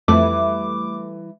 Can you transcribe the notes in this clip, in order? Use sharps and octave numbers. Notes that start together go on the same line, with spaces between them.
F2 E3 G3 A3 E4 D6